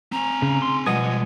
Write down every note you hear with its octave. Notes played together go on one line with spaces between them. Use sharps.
C4 G#5 A#5
C#3
C6
B2 F3 G3 G#3 D#5 F#5 G#5